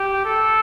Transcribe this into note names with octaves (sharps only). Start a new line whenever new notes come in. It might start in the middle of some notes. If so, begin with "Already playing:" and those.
Already playing: G4
A4